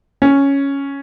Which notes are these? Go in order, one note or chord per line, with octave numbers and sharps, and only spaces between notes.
C#4